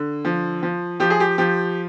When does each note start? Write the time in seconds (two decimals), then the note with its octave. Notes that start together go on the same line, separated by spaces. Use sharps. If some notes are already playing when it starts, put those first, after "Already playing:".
Already playing: D3
0.25 F3
0.63 F3
1.00 F3 G4
1.10 G#4
1.20 G4
1.38 F3 G4